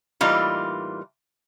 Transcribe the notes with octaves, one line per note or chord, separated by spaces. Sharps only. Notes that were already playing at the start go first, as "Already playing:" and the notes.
A2 E3 G3 A#3 D#4 F4